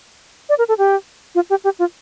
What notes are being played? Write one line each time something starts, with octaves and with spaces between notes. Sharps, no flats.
D5
A#4
A4
G4
F4
G4
G4
F4